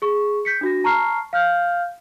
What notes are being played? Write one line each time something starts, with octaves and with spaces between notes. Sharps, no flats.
G#4 C#6
G6 B6 C#7
D4 F#4 A#6
A5 A#5 C#6 F6 C7
F5 F6 G6